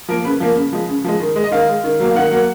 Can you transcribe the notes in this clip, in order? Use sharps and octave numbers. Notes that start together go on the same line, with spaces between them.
F3 A#3 A#4
C#3 B4
F3 A#3
C#3
F3 G#3
C#3
F3 G#3
D#3
G#3
D#5
D#3 F5
G#3
D#3
F#3 A#3
F5
D#3 F#5
F#3 A#3